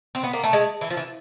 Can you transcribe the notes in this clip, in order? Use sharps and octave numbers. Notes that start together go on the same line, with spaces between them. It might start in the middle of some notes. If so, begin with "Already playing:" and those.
C4
B3
A#3
A3
G#3
E3
F3
E3